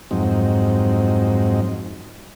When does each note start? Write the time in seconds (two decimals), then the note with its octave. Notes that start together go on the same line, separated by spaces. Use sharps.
0.11 F2 G#2 F#3 C4 D#4